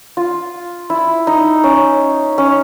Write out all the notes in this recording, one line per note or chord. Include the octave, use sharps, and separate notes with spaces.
F4
E4
D#4
C#4
C#4